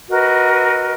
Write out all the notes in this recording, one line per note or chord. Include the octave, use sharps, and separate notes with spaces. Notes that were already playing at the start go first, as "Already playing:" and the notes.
F#4 A#4 B4 D#5